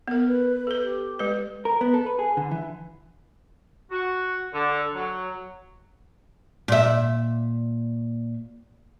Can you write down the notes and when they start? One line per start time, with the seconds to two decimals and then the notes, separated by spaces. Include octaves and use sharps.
0.08 B3 A#4
0.27 B4
0.67 A4 B4
0.83 G4
1.19 G#3 B4
1.65 A#4
1.81 B3
1.94 A4
2.06 B4
2.19 G#4
2.37 D3
2.51 E3
3.91 F#4
4.54 D3
4.94 F#3
6.68 A#2 E5